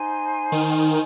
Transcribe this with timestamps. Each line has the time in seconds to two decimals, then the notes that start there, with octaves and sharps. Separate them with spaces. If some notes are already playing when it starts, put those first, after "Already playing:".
Already playing: D#4 C5 G#5 C6
0.52 D#3